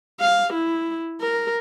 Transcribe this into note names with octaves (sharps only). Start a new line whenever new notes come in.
F5
E4
A#4